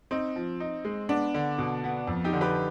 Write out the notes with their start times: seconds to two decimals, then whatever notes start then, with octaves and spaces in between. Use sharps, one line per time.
0.11 C4 D#4
0.36 F3
0.60 D#4
0.85 G#3
1.09 B3 D4
1.34 D3
1.58 B2
1.84 B3
2.07 F2
2.24 D#4 G4
2.33 D3
2.41 G4 B4